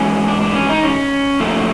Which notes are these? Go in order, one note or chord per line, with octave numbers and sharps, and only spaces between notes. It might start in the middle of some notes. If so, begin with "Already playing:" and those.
Already playing: G#2 E3 G#3 C#4
D4
D4
C#4
D#4
C#4
A#2 F3 A3